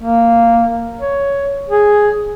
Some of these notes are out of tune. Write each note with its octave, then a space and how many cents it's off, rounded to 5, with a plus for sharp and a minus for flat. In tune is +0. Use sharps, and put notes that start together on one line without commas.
A#3 -10
C#5 +10
G#4 +0